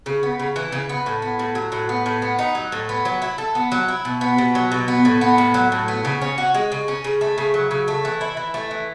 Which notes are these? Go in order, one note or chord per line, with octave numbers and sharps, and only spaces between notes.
C#3
B3
C#3
E3
C#3
B3
A2
B3
A2
F#3
A2
B3
A2
B3
D#4
F#3
A2
B3
F#3
E4
A4
B3
F#3
E4
B2
B3
B2
F#3
B2
B3
A2
B3
A2
F#3
A2
B3
C#3
C#4
F#4
G#3
C#3
C#4
C#3
A3
C#3
F#3
C#3
A3
E3
E4
E3
A3
E3